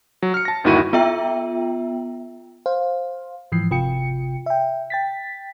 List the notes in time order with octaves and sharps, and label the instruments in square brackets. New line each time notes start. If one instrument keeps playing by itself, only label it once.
[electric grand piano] F#3
F6 C#7
A5 A#6
G1 D#2 D#3 E4 F#4 D#7
[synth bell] B3 F4 E5 G5
[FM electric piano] C5 F5
G#2 E3 F3 C7
G1 C3 F4 G5 C#7
E5 G5
G5 A6 B6